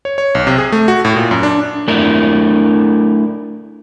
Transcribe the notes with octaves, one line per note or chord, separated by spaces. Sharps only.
C#5
C#5
B1
C3
G#4
A3
F#4
A2
A#2
F#2
D4
A3 D4 E4 A#4